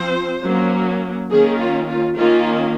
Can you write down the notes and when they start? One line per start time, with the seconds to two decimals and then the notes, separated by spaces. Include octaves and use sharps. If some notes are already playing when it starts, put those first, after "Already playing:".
Already playing: F3 C4 C5
0.44 F#3 A#3 C#4
1.29 D#3 A#3 C#4 G#4
1.58 F4
1.87 F4
2.16 D#3 A#3 C#4 F4